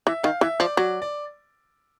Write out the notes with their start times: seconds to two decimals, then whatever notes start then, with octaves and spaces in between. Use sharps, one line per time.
0.07 E3 E5
0.24 D#3 F5
0.41 E3 E5
0.60 F3 D5
0.77 F#3 D5
1.02 D5